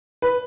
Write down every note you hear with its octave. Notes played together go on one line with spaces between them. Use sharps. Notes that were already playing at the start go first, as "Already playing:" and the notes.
B4